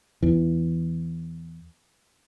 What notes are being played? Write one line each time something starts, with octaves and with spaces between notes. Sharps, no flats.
E2 E3